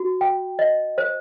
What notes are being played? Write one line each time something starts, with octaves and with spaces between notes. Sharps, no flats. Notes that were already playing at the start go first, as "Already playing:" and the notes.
Already playing: F#4
G5
D#5
C5